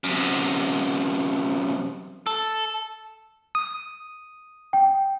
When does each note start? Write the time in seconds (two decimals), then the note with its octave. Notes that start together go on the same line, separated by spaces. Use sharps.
0.04 F#2 C3
2.27 A4
3.55 D#6
4.73 G5